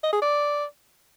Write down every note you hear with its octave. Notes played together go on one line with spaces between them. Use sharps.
D#5
G#4
D5